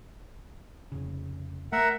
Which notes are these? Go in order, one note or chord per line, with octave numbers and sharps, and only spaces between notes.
F1 C#3
A3 A#4 E5 F#5